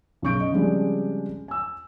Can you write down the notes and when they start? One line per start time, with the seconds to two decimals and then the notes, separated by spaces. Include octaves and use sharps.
0.22 B1 F#2 C#3 C#6 G6 D7
0.40 D#5
0.52 C#3 F3 G3 G#3 C4 D4
1.48 G#5 E6